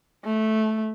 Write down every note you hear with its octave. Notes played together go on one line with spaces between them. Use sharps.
A3